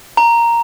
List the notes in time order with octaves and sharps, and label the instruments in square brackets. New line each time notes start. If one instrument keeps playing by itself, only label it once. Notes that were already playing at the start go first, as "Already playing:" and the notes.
[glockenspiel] A#5